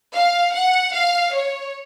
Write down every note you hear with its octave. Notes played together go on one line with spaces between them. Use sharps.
F5
F#5
F5
C#5